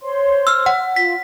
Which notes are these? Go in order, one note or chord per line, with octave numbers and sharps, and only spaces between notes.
C5 C#5 C6
E6 F6
F#5
F4 B6